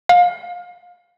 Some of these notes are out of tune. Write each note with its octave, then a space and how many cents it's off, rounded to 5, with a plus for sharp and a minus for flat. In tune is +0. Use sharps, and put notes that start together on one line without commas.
F5 +25